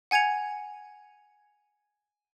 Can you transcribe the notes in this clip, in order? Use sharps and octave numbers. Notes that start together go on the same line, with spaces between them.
F#5 G#5 G#6 C#7 F7